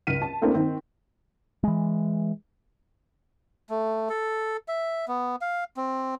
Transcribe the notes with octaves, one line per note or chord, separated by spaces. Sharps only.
C#2 F6 B6 D#7
A5
A3 A#3 C4 D4 E4 A#4
D#3 C4
E3 G#3
A3
A4
E5
B3
F5
C4